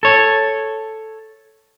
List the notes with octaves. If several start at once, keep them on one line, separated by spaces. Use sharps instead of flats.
A4 C#5